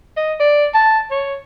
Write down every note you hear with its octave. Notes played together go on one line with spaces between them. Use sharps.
D#5
D5
A5
C#5